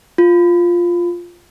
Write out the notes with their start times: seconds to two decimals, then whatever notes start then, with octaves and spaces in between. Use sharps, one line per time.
0.18 F4